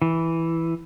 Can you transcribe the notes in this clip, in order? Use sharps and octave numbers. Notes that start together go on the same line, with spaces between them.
E3